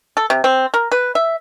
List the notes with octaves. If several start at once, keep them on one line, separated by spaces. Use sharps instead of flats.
A4
C3
C4
A#4
B4
E5